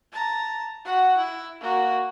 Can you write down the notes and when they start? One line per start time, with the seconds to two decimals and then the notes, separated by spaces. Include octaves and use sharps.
0.12 A5 A#5
0.85 F#4 F#5
1.18 E4
1.60 A#3 F#4